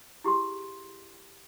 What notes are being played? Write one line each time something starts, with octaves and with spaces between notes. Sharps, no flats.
E4 G4 G#4 C6